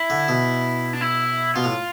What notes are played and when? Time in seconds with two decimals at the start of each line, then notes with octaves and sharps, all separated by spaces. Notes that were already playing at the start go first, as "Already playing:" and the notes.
Already playing: E4
0.10 D3
0.28 B2
0.93 D4
1.01 E4
1.55 B2 F4
1.64 A2